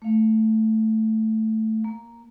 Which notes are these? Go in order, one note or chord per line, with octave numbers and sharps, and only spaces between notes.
A3 F5
A#3